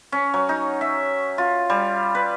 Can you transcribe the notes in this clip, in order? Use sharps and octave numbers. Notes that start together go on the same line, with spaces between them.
C#4
F#3
D#4
E5
F4
G3
B4